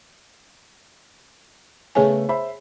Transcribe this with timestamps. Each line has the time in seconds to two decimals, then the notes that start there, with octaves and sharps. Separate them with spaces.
1.95 C#3 A3 B3 G#4 C#5 G#5
2.29 C5 E5 B5